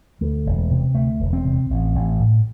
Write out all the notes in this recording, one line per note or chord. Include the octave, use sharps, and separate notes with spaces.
D2 A3
E1
C3
D2 A3
E1
C4
C3
A1
A1
A2